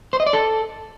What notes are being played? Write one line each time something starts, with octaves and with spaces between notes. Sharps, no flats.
C5
D#5
D5
A4